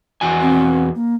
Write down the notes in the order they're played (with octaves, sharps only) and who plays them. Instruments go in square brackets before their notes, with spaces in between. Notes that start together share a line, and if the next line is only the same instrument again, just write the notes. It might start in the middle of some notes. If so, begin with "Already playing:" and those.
[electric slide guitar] E2 F#4 G#5
[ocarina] C4
A#3